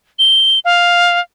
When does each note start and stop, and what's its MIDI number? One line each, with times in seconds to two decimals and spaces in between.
0.19 0.59 103
0.65 1.20 77